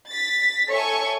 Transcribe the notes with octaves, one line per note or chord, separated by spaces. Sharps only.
A6 B6
A4 C#5 E5 G#5 C#6